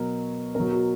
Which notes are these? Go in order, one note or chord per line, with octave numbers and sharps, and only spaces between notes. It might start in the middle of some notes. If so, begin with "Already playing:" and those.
Already playing: B2 F#3 A#4
B2 F#3 A#4
F#4